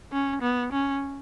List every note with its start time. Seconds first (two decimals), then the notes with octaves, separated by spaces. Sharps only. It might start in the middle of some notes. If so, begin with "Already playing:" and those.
0.13 C#4
0.42 B3
0.73 C#4